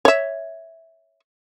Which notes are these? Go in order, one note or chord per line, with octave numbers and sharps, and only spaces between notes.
C#5 E5